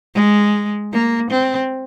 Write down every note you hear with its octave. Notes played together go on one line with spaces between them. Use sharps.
G#3
A#3
C4